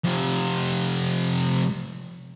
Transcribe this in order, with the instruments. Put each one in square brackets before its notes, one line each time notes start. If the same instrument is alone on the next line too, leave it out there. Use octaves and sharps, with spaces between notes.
[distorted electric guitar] F2 C3